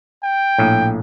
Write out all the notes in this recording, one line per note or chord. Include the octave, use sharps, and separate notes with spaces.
G5
A#1 A2